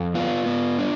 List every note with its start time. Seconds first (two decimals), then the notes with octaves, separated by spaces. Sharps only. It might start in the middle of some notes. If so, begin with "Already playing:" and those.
Already playing: F2
0.14 B3 F4
0.46 B3
0.79 D4